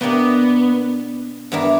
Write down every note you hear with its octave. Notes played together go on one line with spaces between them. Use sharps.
B2 A#3 B3 D4 G4 A#4
G2 E3 B3 D4 A#4